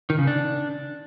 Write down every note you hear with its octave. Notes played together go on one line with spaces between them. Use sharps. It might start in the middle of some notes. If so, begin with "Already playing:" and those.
D#3
C#3
D4